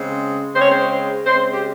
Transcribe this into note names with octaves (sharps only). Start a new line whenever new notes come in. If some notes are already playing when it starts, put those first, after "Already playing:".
Already playing: C#3 G#3 C4
C#3 G#3 C4 C5
C#5
C5
C#3 G#3 C4 C5
G4